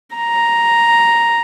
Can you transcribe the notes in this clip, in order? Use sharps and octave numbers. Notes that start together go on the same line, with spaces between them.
A#5